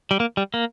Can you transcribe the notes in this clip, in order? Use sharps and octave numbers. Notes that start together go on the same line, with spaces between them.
G3
A#3
G3
A#3